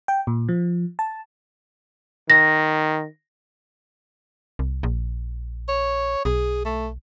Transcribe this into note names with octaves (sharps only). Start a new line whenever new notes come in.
G5
A#2
F3
A5
D#3 A#6
C2
A#1
C#5
B1 G#4
A3